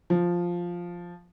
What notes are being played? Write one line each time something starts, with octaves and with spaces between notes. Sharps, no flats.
F3